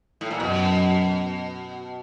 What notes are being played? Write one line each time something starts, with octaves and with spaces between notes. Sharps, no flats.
A2
A#2
F#2 B2